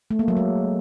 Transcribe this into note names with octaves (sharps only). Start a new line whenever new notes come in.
A3
A#3
F#3
G#3